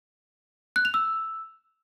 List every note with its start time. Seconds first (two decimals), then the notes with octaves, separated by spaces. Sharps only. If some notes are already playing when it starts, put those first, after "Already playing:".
0.76 F#6
0.85 F7
0.94 E6